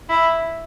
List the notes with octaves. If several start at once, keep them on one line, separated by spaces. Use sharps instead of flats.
E4